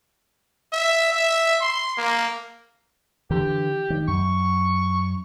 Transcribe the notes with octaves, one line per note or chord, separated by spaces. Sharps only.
E5
E5
C6
A#3
D3 E3 G4
D#3
F#2 C#6